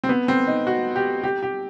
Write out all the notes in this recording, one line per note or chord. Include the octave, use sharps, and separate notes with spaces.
C4
B3
C4
D#4
F#4
G4
G4
G4